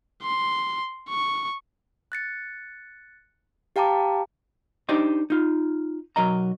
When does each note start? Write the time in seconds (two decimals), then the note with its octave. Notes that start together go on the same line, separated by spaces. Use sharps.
0.23 C6
1.09 C#6
2.12 F#6 A6 C#7
3.76 G4 F5 G5 A5 A#5 D6
4.89 D4 D#4 G4 C5 D5 D#5
5.30 D#4 F4
6.16 B1 F#3 A#4 D#5 A#5